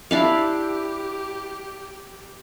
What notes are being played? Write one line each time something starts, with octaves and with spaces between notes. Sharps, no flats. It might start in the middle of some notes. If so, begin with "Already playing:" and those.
D4 E4 G4 F5